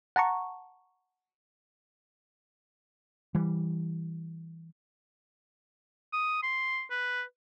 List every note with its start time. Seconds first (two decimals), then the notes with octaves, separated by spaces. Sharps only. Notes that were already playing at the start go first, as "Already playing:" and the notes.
0.16 F#5 A5 A#5 C#6
3.35 E3 G3
6.13 D#6
6.43 C6
6.90 B4